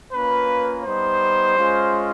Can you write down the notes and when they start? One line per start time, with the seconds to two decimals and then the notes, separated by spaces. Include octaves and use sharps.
0.12 A#3 C#4 F4 B4
0.84 G3 B3 D#4 C5
1.57 G#3 C#4 F4